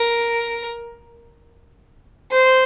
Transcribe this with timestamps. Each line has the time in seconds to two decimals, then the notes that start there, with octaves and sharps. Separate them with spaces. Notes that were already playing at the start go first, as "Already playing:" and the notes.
Already playing: A#4
2.31 C5